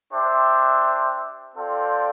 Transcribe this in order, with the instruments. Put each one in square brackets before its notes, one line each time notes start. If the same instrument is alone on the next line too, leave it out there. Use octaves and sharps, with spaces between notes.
[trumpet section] D4 G4 C5 E5 G5
C4 F4 A4 D5 G5